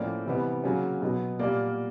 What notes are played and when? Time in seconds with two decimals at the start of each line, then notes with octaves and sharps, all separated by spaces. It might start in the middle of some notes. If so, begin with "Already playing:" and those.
Already playing: A2 F3 A#3 C#4 D5
0.25 C3 E3 G3 B3
0.64 C#3 F#3 A#3 C#4
1.01 B2 F#3 B3
1.39 A#2 G3 A#3 D5